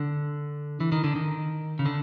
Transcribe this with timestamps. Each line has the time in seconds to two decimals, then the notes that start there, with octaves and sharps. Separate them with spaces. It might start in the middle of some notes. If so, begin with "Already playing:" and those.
Already playing: D3
0.80 E3
0.92 D#3
1.04 D3
1.15 D#3
1.79 C#3
1.86 D3